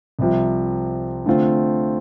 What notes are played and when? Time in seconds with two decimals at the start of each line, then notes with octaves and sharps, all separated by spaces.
0.19 C2 C3 F3
1.26 D3 A3 C4 F4